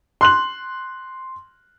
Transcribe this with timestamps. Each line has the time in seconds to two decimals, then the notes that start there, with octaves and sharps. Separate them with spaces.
0.21 C6 F#6 F#7